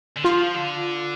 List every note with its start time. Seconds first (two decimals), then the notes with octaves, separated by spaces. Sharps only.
0.17 D3
0.24 F3 F4
0.55 D3